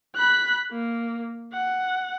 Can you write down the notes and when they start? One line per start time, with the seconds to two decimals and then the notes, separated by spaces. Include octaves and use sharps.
0.16 B5 F#6
0.72 A#3
1.53 F#5